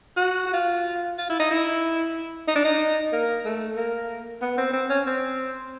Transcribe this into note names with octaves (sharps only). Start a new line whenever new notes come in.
F#4
F#4
F4
F4
E4
D#4
E4
D#4
D4
D#4
A#3
A3
A#3
B3
C4
C4
C#4
C4